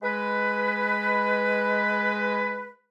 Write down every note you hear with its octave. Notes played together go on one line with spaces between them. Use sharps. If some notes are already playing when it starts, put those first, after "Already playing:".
G#3 B4